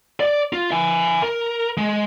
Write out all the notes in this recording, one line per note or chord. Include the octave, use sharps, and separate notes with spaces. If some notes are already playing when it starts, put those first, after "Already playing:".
D5
F4
E5 G#5
A#4
G#3